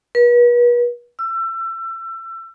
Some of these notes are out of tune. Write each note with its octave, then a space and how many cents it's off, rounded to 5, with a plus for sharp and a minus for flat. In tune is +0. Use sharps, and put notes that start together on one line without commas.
B4 -40
E6 +30